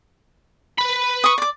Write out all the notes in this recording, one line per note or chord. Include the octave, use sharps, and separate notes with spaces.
B4 B5
C#6 D#6
D5 D6